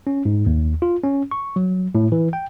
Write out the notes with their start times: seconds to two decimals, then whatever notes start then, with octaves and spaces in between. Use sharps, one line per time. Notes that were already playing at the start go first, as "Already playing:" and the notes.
0.07 C#4
0.25 G#2
0.46 D#2
0.82 F4
1.03 C#4
1.31 C#6
1.56 F#3
1.95 A2
2.12 E3
2.33 G5